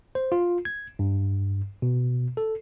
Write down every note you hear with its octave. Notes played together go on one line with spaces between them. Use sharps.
C5
F4
G#6
G2
B2
A4